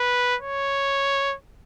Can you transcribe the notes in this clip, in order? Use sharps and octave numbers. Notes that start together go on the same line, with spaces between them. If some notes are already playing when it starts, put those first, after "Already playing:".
Already playing: B4
C#5